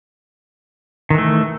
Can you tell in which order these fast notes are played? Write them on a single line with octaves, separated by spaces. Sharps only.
D#3 E3 A3